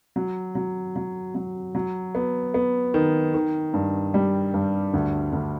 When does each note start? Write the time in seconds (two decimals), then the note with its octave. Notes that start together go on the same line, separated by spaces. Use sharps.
0.16 F#3
0.55 F#3
0.96 F#3
1.35 F#3
1.75 F#3
2.15 B3
2.54 B3
2.94 D#3
3.34 D#3
3.74 G2
4.14 G3
4.54 G2
4.94 D2
5.33 D2